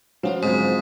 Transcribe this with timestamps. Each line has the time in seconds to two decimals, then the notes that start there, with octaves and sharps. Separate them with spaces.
0.23 F3 C#4 F#4 B4
0.43 G#2 D3 F#3 C4